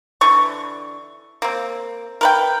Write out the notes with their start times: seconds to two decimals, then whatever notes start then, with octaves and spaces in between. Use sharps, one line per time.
0.21 D3 E3 C#6
1.42 A#3 C4
2.21 A#4 B4 G5